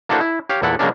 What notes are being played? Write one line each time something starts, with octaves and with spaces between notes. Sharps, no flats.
A#3 D4 E4 F#4 A4 C5
E4
G4 C#5 F5
E2 A#2 E4 A4 F#5
C#3 F#3 G#3 A#3 C#4 D4